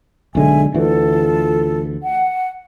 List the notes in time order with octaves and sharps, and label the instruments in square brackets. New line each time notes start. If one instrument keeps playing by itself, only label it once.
[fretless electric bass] B1 D3 G#3 [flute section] E5 G#5
[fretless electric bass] D2 E3 [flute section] F4 A4
[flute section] F#5